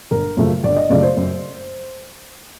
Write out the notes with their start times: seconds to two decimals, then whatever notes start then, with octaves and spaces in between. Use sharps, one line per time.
0.11 G1 A#4
0.37 F#2 C#3 F3 A3
0.63 G1 D5
0.77 D#5
0.90 F#2 C#3 F3 A3 D5
1.03 C5
1.17 F#2